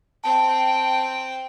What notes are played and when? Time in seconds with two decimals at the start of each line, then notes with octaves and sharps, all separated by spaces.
0.24 C4 G5 A5